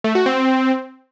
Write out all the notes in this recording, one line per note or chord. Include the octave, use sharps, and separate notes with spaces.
A3
F#4
C4